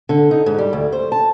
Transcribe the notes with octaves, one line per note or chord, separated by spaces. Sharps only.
D3
D#4
G#2
G3
D2
C5
A5